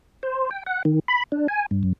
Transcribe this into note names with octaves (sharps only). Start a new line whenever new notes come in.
C5
G5
F#5
D#3
B5
D4
G#5
G2
F#2